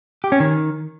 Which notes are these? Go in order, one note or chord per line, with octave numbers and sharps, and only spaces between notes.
G4
C#4
D#3